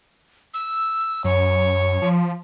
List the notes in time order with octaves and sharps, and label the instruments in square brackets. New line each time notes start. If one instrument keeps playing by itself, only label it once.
[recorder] E6
[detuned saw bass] F#2 [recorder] C#5
[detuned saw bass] F3